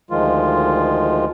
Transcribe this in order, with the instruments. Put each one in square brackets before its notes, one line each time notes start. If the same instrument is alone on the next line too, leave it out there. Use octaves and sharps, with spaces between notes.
[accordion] D2 D#3 F3 G#3 F4